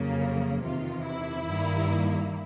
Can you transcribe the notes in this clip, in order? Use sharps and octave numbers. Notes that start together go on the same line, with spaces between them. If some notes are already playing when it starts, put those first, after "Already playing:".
Already playing: F2 C#3 F#3 A#3
E2 C3 D#3 F4
E4
G2 D#3 G3 A#3